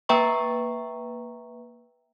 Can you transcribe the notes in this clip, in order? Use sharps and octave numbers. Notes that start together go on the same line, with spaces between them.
A#3 B4 E5 G5 A#5 C#6